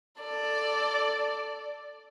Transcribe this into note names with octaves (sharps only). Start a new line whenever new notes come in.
A4 D5